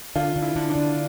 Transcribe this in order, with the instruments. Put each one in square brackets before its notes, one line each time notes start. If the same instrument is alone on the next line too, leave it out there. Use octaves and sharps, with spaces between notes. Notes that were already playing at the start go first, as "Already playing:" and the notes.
[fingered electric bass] D3 [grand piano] F4
[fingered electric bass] D3
[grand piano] E4
[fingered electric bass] D3
[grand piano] D4
[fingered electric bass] D3